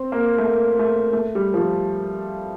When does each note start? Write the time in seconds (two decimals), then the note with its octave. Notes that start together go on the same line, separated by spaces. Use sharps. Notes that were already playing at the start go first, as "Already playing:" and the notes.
Already playing: C4
0.12 A#3
0.38 A3
0.45 A#3
0.79 A3
1.13 A3
1.35 G3
1.54 F3
1.57 G3